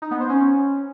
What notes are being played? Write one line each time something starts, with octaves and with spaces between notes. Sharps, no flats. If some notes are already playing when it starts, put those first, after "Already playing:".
D#4
B3
C5
C#4